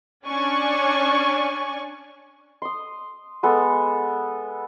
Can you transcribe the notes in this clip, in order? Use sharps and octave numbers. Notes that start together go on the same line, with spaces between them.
C#4 D4 D5 G#5 C#6
C6 D#6
G#3 B3 A4